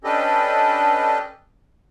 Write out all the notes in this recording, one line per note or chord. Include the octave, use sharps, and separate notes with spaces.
C#4 D4 G4 A4 B4 D#5